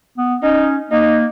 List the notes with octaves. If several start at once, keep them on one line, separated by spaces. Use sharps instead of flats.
B3
C#4 D#4
A#3 D#4